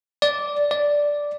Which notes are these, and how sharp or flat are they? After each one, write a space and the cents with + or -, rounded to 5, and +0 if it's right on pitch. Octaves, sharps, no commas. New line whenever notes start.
D5 -10
D5 -5